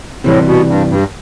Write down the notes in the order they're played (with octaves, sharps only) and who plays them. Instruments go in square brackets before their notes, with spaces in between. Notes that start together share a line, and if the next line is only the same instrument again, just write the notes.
[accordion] A2 [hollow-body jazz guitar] C3 E3 G3
[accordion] B2
G2
G2